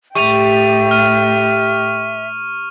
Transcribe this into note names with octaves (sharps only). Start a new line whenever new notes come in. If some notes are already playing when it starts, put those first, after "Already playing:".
A2 G3 E5 G5 C#6 D#7 F7
F6 D#7